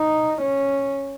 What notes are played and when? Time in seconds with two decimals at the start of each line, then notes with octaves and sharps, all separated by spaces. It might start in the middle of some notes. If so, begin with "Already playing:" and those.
Already playing: D#4
0.41 C#4